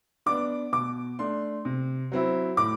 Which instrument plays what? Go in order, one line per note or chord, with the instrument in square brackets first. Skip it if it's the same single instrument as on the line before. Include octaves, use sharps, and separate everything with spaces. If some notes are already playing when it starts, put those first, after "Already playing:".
[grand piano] B3 D4 D6
B2 D6
A3 D4 C6
C3
F#3 C4 E4
A2 D6